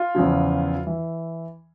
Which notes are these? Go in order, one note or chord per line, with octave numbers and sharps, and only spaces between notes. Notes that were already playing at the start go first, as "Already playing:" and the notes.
Already playing: F4
E2 C#3 F3
E3